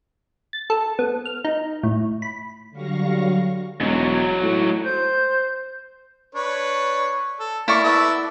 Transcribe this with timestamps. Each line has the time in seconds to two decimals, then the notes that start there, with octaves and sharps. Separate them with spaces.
0.53 A6
0.70 A4
0.99 B3
1.25 F6
1.45 D#4
1.83 A2
2.22 B5
2.70 D3 F#3 G3 F5 C#6 A#6
3.80 E1 G#2 F#3
4.43 A2
4.85 C5 G6
6.35 D4 B4 C#5
7.40 A4
7.68 E4 A#4 D5 C#6
7.84 B3 A4 E5